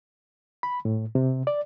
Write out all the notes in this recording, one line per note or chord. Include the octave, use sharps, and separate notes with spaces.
B5
A2
C3
D5